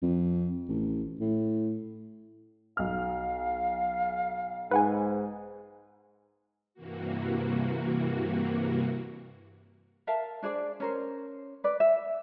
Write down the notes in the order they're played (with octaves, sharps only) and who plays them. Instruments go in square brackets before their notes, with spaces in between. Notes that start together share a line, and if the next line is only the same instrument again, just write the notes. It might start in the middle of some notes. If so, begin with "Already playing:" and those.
[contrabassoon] F2
A1
A2
[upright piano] B1 F6 [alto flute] F5
[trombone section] G#2 [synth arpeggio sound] B4 F#5 G#5
[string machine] G2 C3 E3 A#3 F#4
[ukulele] A#4 E5 F5 A5
D4 G#4 C5 D5
C#4 A#4 C5
B4 D5
E5